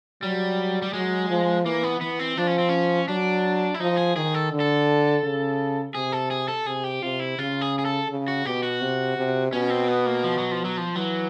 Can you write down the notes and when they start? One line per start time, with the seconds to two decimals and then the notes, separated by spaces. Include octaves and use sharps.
0.22 F#3 G3
0.82 G3
0.93 F#3 G#3
1.30 F3
1.65 E3 A#3
1.83 B3
2.01 E3 B3
2.19 C4
2.37 F3 D4
2.47 C#4
2.58 C4
2.69 C#4
3.08 F#3 D4
3.74 E4
3.80 F3 D#4
3.97 G#4
4.16 D#3 G#4
4.34 A4
4.52 D3
4.60 A4
5.23 C#3
5.95 C3 G#4
6.12 A4
6.31 G#4
6.48 A4
6.66 C3 G#4
6.84 G4
7.02 C3 F4
7.20 E4
7.38 C#3 F4
7.61 G#4
7.79 G#4
7.85 A4
8.09 C#3
8.28 F#4
8.45 B2 G4
8.63 F#4
8.81 C3
9.17 C3
9.52 B2 C#4
9.70 C4
9.88 B3
10.06 A#3
10.24 F3
10.38 F#3
10.51 F3
10.65 F#3
10.77 F3
10.96 E3 F#3